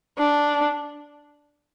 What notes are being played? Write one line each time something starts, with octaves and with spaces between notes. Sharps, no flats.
D4